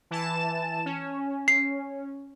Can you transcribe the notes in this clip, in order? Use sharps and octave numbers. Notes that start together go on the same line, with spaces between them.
E3 A5 E7
C#4
C7